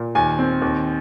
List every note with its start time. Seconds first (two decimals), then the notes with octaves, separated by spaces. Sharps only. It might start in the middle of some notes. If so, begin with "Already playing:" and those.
Already playing: A#2
0.15 D#2 G#5
0.39 C4
0.62 D#2